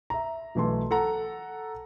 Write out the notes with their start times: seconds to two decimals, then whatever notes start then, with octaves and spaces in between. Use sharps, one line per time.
0.10 E5 A#5
0.55 B1 E3 A3 C6
0.91 A4 F#5 A#5